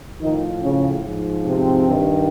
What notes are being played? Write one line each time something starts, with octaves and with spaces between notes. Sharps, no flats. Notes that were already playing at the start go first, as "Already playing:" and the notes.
A2 D#3 F3 D#4
C#3 C#4
G#2 F3
C3 C4
G2 D#3